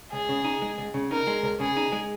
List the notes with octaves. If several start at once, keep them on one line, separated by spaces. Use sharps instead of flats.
C#2 G#4
C#3
D#4
G#3
C#2
C#3
D#4 A#4
G#3
C#2
C#3 G#4
D#4
G#3